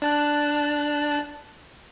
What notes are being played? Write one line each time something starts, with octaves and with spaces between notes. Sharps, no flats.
D4 A5 F#6